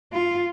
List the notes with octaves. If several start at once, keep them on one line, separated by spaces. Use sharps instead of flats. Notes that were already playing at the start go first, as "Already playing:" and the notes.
F4